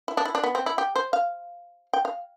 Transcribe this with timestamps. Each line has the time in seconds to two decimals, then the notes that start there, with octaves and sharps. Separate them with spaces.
0.08 E4
0.17 D4
0.25 E4
0.35 D4
0.44 B3
0.55 C4
0.66 E4
0.78 G4
0.96 C5
1.13 F5
1.93 G5
2.05 F5